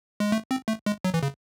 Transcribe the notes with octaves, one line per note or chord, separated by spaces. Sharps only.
G#3
A3
C4
A3
G#3
F#3
E3
C#3